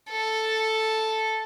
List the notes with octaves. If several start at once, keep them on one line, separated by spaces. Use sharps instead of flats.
A4